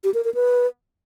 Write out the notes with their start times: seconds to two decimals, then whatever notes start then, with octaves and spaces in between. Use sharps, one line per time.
0.04 G4
0.14 A#4
0.24 A#4
0.35 B4